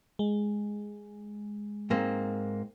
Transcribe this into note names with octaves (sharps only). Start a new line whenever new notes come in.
G#3
G#2 A#3 C4